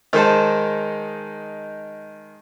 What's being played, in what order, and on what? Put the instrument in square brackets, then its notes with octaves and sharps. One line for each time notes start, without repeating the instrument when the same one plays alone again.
[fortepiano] D#3 G#3 D#4 C5 A5